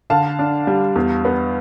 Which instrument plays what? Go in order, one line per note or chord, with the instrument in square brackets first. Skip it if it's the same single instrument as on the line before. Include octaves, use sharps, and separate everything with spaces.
[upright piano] D3 F5 A5
D4
G3
E2
B3